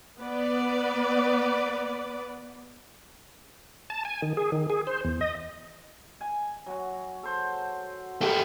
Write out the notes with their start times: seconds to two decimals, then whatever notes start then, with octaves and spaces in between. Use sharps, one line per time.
0.21 B3 B4 D5
3.90 A5
4.05 G#5
4.22 D#3
4.37 G#4
4.52 D#3
4.70 G#4
4.87 C5
5.05 E2
5.21 D#5
6.21 G#5
6.66 F#3 F#4
7.23 A4 C5
8.21 G#3 A3 G4